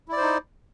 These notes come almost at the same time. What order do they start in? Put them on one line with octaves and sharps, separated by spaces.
E4 D5 C5 D#4